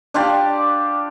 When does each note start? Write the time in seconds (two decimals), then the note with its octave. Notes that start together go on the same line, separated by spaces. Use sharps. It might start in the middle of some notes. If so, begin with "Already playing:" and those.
0.14 D4 F4 G4 D5